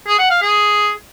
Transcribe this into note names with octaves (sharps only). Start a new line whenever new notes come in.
G#4
F#5
F5
G#4